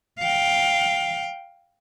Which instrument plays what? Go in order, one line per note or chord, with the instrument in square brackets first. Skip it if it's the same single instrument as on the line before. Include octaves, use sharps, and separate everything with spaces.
[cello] F5 G5